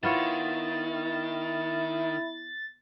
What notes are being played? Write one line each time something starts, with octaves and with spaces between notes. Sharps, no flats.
D#3 B3 E4 F4 C#5 A6